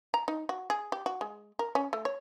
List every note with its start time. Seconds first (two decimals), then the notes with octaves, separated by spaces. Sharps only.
0.14 A#5
0.28 D#4
0.49 F#4
0.70 G#4
0.92 G4
1.06 F#4
1.21 G#3
1.59 A#4
1.75 C#4
1.93 A3
2.05 C#5